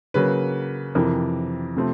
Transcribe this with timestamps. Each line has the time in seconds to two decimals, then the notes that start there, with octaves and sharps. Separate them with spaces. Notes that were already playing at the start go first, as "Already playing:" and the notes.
0.14 C#3 F#3 A#3 B4
0.95 F2 C3 E3 A#4
1.77 C3 F3 A3 C4